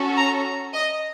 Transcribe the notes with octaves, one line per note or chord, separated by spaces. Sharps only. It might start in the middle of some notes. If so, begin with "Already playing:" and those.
Already playing: C#4 F#4 A4
A#5
D#5